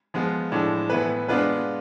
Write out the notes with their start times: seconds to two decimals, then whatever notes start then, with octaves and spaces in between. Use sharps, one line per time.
0.14 F3 G#3 B3 F4
0.52 A2 F3 G#3 D4
0.90 A2 E3 B3 E4 B4
1.29 G#3 B3 D4 F4 B4